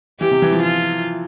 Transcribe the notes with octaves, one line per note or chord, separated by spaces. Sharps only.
E3 G4
C3
E3
F3
F4